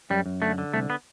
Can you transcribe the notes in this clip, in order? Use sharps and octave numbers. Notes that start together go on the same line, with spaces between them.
F#2 G3
F#2
D3 A3
D3
C2 A3
B3